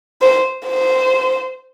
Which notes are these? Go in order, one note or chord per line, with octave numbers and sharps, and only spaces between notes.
C5
C5